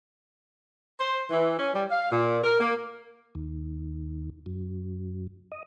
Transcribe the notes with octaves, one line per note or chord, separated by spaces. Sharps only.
C5
E3
C#4
G3
F5
A#2
A#4
A#3
D#2
F#2
D#5